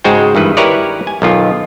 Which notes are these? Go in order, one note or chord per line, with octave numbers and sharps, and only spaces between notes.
G#2 C#3 G#3 F#4 C5 G5
G2 D#3 E3 B4
E4 G4 A#4 B4 C#5 D5
G#5
B1 D#3 F4